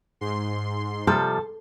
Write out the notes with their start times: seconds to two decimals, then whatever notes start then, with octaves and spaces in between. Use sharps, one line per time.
0.21 G#2 C6
1.07 C3 F3 G3 A4